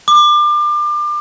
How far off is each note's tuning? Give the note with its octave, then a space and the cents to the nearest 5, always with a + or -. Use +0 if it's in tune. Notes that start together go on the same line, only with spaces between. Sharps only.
D6 +30